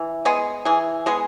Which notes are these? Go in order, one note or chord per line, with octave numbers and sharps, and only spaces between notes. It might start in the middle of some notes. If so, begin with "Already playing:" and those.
Already playing: E3
G#3 B3 G#4
E3 G#4
G#3 B3 G#4